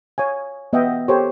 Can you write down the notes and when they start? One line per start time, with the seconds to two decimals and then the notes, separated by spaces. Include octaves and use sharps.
0.18 C#5 F5 G#5
0.73 B3 D#5 E5 F#5 G5
1.08 G4 A4 A#4 C5 C#5